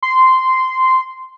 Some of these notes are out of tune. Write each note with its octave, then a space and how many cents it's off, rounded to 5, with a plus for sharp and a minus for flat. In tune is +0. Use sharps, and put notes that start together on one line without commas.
C6 -10